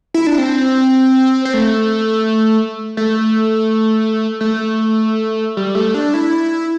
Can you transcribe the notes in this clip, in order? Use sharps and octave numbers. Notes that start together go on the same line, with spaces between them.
E4
D4
C4
C4
A3
A3
A3
G3
A3
D4
E4